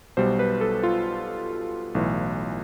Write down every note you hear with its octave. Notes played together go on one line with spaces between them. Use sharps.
B1 B2 G3 C5
B4
A4
F4
B1 A2 E3